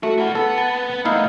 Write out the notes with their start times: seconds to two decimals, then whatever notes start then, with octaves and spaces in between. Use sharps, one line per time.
0.03 A3 F#4
0.18 E4 F#5
0.35 B3 A4 F#5
0.58 A5
1.05 A3 B3 D#4 E4 F5